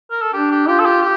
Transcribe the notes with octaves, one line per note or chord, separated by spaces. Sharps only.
A#4
A4
D4 G4
G4
F4 G4
A4
G4
G4